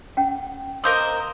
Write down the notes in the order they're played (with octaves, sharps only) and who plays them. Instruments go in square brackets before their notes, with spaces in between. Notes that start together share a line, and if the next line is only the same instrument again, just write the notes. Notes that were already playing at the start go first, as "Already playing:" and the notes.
[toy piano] C#4 F#5 G5
[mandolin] A#4 C5 D#5 [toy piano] F5 D6 E6